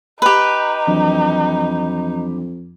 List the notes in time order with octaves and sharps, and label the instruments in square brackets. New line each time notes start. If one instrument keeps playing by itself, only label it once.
[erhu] D#4 [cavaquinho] G4 B4
[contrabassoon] F2 [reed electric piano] E3 F#3 D4